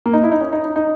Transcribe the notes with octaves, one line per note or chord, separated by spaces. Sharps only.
A#3
D#4
E4
D#4
C#4
D#4
D#4
D#4